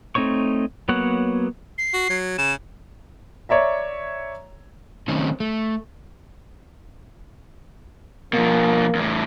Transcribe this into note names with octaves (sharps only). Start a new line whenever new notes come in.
A3 C4 D#4 C#5 C#6
F#3 A#3 B3 C#5 F#5
C7
F#4
F#3
C#3 E7
C#5 D5 E5 A#5
D#3 A3 C4 C#4 D#4
A3
B2 F3 A#3
E2 A2